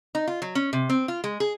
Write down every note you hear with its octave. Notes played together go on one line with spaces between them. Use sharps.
D#4
F4
F#3
C#4
C3
C4
F4
G#3
G#4